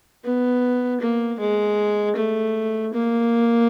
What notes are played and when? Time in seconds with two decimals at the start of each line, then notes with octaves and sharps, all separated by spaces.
0.25 B3
1.01 A#3
1.40 G#3
2.16 A3
2.93 A#3